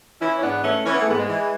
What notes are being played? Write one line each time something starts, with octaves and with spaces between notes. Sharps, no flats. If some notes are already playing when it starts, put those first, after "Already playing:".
E3 C#4 E4
C#4
G#2 B3 D4
E3 A3 C#4
E3 C#4
B3
A3
G#2 G#3 B3
G#3
E3